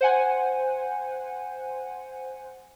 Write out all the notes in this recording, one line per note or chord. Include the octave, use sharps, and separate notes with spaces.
C5 F#5 G#5